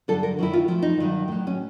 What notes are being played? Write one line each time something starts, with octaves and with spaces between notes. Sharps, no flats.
G2 D3 F#3 A4
A#4
F#2 D#3 F#3 E4
F4
A2 F3 E4
D#4
G2 D#3 F#3
A2 F#3
C#4